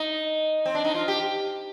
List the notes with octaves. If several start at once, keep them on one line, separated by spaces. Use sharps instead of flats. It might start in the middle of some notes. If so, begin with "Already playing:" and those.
Already playing: D#4
C4
D4
D#4
F4
G4